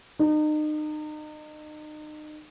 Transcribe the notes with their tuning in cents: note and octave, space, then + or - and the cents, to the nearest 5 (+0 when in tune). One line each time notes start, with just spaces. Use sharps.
D#4 -35